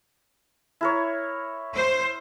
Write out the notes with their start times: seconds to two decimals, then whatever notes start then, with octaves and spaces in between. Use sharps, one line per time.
0.81 E4 A#4 C#5
1.76 C5